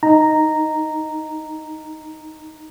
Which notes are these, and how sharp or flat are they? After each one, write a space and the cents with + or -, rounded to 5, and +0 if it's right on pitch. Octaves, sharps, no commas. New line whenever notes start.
D#4 +0 A#5 -5